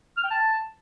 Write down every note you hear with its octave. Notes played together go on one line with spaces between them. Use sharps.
F6
G5
A5